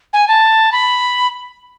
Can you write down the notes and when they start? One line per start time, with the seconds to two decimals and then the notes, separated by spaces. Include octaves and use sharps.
0.13 G#5
0.28 A5
0.72 B5